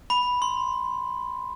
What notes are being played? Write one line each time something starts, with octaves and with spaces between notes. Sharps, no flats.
B5
C6